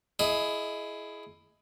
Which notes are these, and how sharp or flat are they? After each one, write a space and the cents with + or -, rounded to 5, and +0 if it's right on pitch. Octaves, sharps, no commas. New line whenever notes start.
E4 +15 G#4 +25 D#5 +0